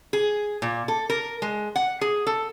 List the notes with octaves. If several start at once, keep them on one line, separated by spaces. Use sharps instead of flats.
G#4
A#2
A4
A#4
G#3
F#5
G#4
A4